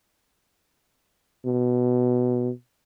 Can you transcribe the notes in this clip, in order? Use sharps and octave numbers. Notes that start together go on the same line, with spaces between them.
B2